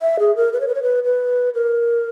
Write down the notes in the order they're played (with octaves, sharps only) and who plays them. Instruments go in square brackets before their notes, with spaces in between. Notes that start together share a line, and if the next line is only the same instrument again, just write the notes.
[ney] E5
G#4
A#4
B4
C#5
B4
C#5
B4
B4
A#4